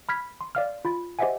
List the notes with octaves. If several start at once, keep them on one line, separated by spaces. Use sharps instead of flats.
B5 F6 G#6 B6
C6
D5 F5 F6
F4 B5 A6
G4 C5 D#5 E5 F#5 G#5